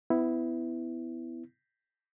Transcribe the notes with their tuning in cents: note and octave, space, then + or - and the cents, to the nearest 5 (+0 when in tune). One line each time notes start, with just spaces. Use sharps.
B3 +25 E4 +0